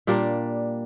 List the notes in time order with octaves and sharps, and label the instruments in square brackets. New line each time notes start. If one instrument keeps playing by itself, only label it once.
[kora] A#2 G3 A#3 D4